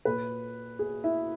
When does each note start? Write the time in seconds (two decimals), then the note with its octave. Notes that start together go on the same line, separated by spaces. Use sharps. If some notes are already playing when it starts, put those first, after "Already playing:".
0.05 A#2 B4
0.79 G#4
1.04 E4